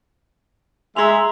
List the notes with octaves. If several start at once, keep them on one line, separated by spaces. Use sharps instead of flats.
G#3 E5 A#5 C6 F7